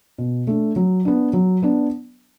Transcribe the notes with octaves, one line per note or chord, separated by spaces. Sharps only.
B2
A3 D4
F#3
B3 D4
F#3
B3 D4